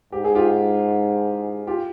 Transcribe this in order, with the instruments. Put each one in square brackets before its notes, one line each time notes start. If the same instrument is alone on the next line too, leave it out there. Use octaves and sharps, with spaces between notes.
[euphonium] G#2 [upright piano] G4
[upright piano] G#4
F4 G4
F4 G4